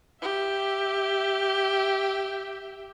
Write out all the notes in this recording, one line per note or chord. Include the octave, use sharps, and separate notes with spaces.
G4 E5